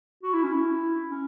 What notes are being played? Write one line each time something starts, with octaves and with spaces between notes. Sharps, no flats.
F#4
E4
C#4
E4
C#4